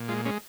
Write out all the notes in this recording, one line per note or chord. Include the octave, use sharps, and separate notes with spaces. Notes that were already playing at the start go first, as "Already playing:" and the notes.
Already playing: A#2
G#3 F4
G#3 C#4